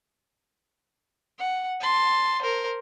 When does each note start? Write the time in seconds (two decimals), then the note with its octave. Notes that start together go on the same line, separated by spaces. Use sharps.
1.39 F#5
1.81 A5 C6
2.42 A#4 C5